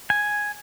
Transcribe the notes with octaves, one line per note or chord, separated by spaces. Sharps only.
G#5